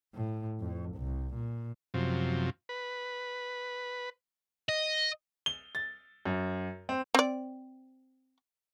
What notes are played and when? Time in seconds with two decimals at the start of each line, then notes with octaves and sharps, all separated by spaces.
0.15 A2
0.60 F2
0.96 C2
1.34 A#2
1.94 F#2 C3 F3
2.69 B4
4.69 D#5
5.46 G7
5.75 A6
6.25 F#2
6.89 C4
7.14 C4 D5